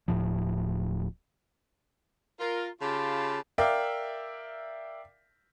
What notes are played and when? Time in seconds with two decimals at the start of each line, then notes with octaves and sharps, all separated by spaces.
0.08 D1 G1 A2 F3
2.39 F4 A#4
2.81 C#3 F4 G4 A5 B5 C6
3.58 A#4 D5 E5 F5 G5